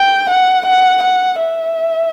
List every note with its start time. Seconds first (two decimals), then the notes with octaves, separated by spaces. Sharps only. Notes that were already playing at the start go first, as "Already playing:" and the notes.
Already playing: G5
0.29 F#5
0.66 F#5
1.03 F#5
1.39 E5